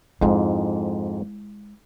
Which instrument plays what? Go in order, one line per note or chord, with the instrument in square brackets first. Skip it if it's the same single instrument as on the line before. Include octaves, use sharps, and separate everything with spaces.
[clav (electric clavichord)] F2 G#2 [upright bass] G#3 E4